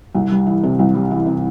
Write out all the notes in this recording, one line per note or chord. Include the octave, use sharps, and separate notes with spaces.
C2
G3
E3
C3
C2
G3
E3
C3